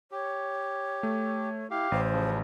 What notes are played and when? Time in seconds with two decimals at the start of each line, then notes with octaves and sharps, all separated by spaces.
0.11 G4 C#5
1.03 A3
1.71 E4 G4 F5
1.92 A1 C5
2.12 C#3 F3